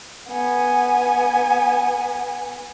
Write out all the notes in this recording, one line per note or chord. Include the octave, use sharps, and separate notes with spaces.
B3 G#5